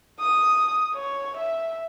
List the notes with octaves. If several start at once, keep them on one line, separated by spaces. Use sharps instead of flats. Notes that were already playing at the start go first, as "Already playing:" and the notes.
D#6
C#5
E5